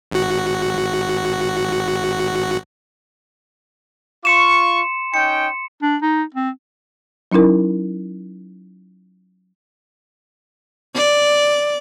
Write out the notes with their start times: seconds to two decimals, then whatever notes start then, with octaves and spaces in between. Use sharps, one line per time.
0.12 G#1 F#4
4.25 F4 C6 C#6 C#7 E7
5.14 C#4 D#4 G5 C#7
5.82 D4
6.02 D#4
6.34 C4
7.32 F#3 C#4 D#4 E4 A#4
10.95 D5